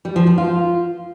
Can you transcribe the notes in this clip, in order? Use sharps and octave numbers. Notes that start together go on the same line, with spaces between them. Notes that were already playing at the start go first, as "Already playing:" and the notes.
G3
F3
F3
F4